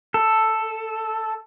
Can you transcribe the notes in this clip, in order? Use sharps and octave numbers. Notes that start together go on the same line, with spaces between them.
A4